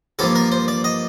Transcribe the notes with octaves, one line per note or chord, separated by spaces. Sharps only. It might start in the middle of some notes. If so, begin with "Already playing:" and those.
G2 F3 A#3 A4
A#4
C5
D5
D#5